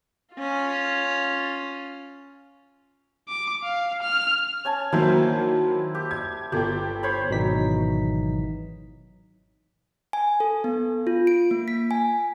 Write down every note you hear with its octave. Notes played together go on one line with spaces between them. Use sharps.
C#4 F4
D6
F5
F6
C#4 G#5 A5
D#3 F#3 A#3 E4 C5
G4
G#6
G1 G4 A4 G5
C5 C#5 B5
G#1 B2 E3 F#3 D#4 B6
G#5
A4
B3
F4
D7
A#3
B6
G#5